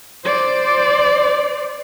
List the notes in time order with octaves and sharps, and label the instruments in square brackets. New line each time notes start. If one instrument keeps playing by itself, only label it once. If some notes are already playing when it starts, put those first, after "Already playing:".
[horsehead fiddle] C5 D5